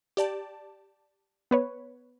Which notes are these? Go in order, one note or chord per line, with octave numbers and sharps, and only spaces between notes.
G4 D5 A5
B3 B4 C#5